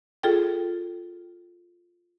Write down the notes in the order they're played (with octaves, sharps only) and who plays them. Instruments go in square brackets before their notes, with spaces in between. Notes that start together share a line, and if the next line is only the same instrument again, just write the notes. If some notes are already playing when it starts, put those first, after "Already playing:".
[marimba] F4 G#4 A4 G5